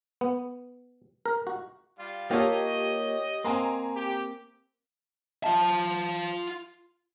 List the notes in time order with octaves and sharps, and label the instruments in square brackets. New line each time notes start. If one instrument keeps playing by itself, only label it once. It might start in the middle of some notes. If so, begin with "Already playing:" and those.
[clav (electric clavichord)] B3
A#4
F#4
[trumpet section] G3 F4
[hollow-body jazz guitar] A#3 F4 A4 [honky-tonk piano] G4 C#5 [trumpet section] D#5
[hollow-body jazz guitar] A#3 C4 [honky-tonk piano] G#5 A#5 C6
[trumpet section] G4
[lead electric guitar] F4 A5